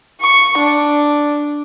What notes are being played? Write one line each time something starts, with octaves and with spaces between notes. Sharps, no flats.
C#6
D4